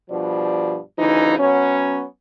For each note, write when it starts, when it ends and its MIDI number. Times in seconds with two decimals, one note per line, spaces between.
0.11 0.77 43
0.11 0.77 47
0.11 0.77 53
0.11 0.77 74
0.99 1.36 38
0.99 1.36 49
0.99 1.36 52
0.99 1.36 63
1.40 2.04 54
1.40 2.04 59
1.40 2.04 61